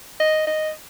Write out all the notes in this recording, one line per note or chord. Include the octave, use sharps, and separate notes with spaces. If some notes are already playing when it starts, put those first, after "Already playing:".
D#5
D#5